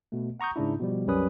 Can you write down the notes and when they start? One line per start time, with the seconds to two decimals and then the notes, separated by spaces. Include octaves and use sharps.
0.12 B2 A3
0.40 F#5 A#5 C#6 D#6 G6
0.56 G#2 C#3 D4 E4
0.80 B2 F3 G3
1.07 C2 F#2 G3 C#4 B4 D#6